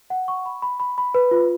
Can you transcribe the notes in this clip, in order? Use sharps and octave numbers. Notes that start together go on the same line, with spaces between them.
F#5
C#6
B5
B5
B5
B5
B4
F4